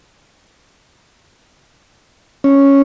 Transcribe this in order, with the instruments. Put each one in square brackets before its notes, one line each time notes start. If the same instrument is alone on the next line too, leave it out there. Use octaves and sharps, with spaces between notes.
[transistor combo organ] C#4